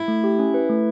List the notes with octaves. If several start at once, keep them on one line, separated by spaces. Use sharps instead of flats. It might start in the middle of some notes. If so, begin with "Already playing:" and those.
Already playing: E4
A3
G4
C#4
B4
A3